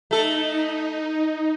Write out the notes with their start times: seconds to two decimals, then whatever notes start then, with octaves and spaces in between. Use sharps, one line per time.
0.11 A3 D#4 A4